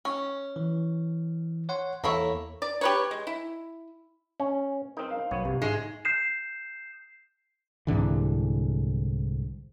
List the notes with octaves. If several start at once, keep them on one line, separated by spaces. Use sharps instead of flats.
C#4
E3
C#5 F#5 C6
E2 A#3 E4 A4 C#5
D5
G4 B4 C#5
G#3
E4
C#4
C4 D#4 A#4
F5
B1 B3 C#5
G1 C3
G#2 G#3
G6 C7 E7
C2 G#2 D3 E3